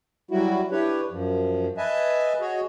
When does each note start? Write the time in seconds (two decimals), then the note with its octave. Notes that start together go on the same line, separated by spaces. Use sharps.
0.31 F#3 G3 E4 F#4
0.71 D4 E4 G4 B4 C#5
1.11 F#2 F3
1.77 B4 D#5 E5 G#5 A5
2.40 F#4 G#4 C#5 D#5